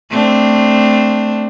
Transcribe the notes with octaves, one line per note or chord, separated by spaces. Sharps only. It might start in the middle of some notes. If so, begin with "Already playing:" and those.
A3 C4 D4